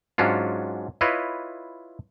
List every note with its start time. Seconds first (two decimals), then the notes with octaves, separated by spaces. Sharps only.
0.18 G#2 F#3 C#4 D4 F4
1.01 E4 F4 B4 C#5 D#5